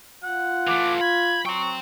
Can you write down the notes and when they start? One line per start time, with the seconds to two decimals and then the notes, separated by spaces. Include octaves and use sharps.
0.24 F4 F#5
0.67 E3 A3 D6
1.01 B5 G#6
1.46 F#3 G5 C6 C#6